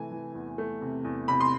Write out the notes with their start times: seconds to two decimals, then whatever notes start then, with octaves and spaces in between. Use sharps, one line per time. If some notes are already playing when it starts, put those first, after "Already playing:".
Already playing: C3 E3 A3 G#5
0.11 E3
0.35 E2
0.58 A3
0.82 C3
1.04 E2
1.28 C3 B5
1.40 C6